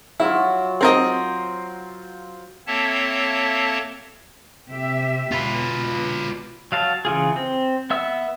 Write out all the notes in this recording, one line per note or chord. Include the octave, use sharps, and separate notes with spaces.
F#3 E4 F4
C4 A#4 C5 D#5
A#3 C4 A4 C#5 E5 A5
C3 G4 E5
B2 F4 B4
F#3 F5 A5
C#3 E3 F4 G#4
C4
B3 E5 E6